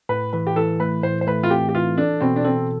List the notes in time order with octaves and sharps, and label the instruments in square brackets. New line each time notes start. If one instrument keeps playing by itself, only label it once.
[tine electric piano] A2 [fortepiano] B4
[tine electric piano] E3 [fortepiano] B4
[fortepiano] G4
[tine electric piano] E3 [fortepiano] A4
[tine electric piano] A3 [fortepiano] B4
[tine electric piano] A2 [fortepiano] C5
[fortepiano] C5
[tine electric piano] A3 [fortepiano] B4
[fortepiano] F4
[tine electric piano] C4 [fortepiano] G4
[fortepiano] G4
[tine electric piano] E3 [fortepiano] F4
[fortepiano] D4 [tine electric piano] A4
[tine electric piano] B2 [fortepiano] C4
[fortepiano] D4
[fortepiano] C4 [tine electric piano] A4